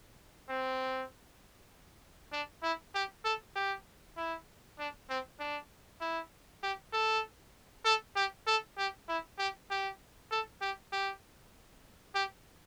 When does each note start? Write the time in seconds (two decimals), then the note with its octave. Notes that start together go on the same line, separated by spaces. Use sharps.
0.49 C4
2.32 D4
2.63 E4
2.95 G4
3.25 A4
3.56 G4
4.17 E4
4.79 D4
5.10 C4
5.39 D4
6.01 E4
6.63 G4
6.93 A4
7.85 A4
8.16 G4
8.47 A4
8.78 G4
9.08 E4
9.39 G4
9.70 G4
10.31 A4
10.62 G4
10.93 G4
12.15 G4